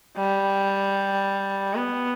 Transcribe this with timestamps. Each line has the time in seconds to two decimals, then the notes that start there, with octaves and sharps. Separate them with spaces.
0.17 G3
1.75 B3